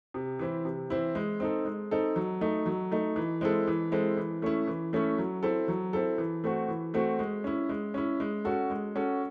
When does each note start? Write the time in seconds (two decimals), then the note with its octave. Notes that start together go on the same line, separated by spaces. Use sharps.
0.14 C3
0.39 E3 C4 E4
0.65 C3
0.90 E3 C4 E4
1.15 G#3
1.40 C4 D#4 A4
1.65 G#3
1.91 C4 D#4 A4
2.16 F#3
2.41 A3 D#4
2.66 F#3
2.92 A3 D#4
3.16 E3
3.41 G#3 C4 E4 A4
3.67 E3
3.92 G#3 C4 E4 A4
4.17 E3
4.42 A3 C#4 E4
4.67 E3
4.93 A3 C#4 E4
5.18 F#3
5.43 C4 E4 A4
5.68 F#3
5.93 C4 E4 A4
6.18 E3
6.44 A3 C4 F#4
6.68 E3
6.94 A3 C4 F#4
7.19 G#3
7.44 C#4 E4
7.69 G#3
7.94 C#4 E4
8.20 G#3
8.45 C#4 F#4 A4
8.70 G#3
8.96 C#4 F#4 A4